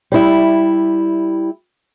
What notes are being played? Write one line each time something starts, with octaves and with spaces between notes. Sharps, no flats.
G3 E4